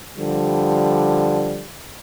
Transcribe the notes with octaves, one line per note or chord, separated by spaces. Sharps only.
D3 F3 G3